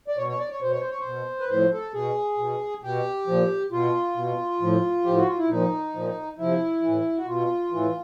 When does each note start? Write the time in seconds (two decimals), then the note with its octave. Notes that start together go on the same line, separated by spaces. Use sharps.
0.08 D5
0.17 B2 C#5
0.29 C#5
0.39 D5
0.50 C#5
0.61 B2 C5
0.71 C#5
0.80 C5
0.90 C#5
0.99 C5
1.06 B2
1.40 B4
1.49 A2 F3 C5
1.72 A4
1.94 B2 G#4
2.38 B2
2.83 B2 G4
3.27 A#2 F3
3.72 B2 F4
4.16 B2
4.61 A2 F3
5.04 A2 F3 G4
5.16 F#4
5.27 F4
5.38 E4
5.49 A#2 F3 D#4
5.94 A#2 F3
6.38 C3 F3 E4
6.82 E3
6.88 A2
7.17 F#4
7.27 B2 F4
7.72 A2 E3